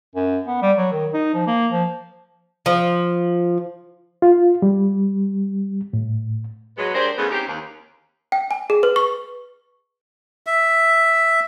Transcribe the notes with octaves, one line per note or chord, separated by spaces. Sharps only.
F#2
B3
G3
F#3
D#3
D#4
F3
A#3
F3
F3
F4
G3
A2
F#3 G#3 B3
D4 G4 G#4 A#4 C5
E2 C#3 E3 G#3 A3 B3
C4 C#4 D#4 G4
D#2
G5
G#5
G#4
B4
C#6
E5